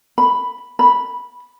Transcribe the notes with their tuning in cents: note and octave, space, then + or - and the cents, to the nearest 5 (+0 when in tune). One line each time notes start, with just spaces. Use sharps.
B5 +5
B5 -5